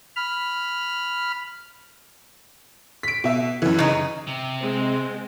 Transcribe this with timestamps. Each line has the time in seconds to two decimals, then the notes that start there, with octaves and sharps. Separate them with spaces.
0.16 B5 F6
3.03 B6 D7
3.24 B2 E5
3.62 F#2 E3
3.79 C#3 D#4
4.27 C3
4.61 G#3 C4